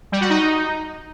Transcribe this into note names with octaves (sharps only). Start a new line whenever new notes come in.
G3
F#4
D#4